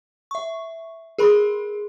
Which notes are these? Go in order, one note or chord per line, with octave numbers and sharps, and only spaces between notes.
E5 C#6
G#4 A#4 B5 C6